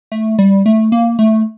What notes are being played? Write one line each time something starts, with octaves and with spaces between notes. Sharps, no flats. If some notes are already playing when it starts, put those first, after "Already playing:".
A3
G3
A3
A#3
A3